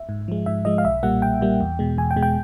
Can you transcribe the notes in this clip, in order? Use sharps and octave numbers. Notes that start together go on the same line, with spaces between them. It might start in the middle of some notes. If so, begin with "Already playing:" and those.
Already playing: E5
G#2
F3 G#3
G#2 E5
F3 G#3 D#5
F5
B1 E5
A#2 G3 A#3 F#5
B1 G5
A#2 G3 A#3
E2
B2 G#3
E2 G#5
G5
B2 G#3
G5